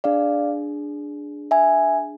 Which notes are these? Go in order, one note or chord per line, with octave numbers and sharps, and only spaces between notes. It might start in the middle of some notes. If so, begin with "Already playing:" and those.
D4 G#4 D5 F5
E5 G#5